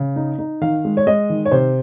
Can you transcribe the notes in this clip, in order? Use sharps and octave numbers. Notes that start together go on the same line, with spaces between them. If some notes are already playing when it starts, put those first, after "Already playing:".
Already playing: C#3
D#4
D#4
D#3 F5
G#3
C#5
G#3 D#5
D#3
C#5
C3 C5